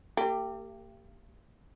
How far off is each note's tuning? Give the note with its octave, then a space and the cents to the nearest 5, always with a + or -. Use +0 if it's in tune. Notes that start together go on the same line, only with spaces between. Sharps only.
A#3 -45 G4 +0